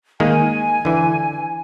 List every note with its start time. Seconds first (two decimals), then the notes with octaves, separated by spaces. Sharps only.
0.20 D#3 G#3 A#3 G#5
0.85 D3 E3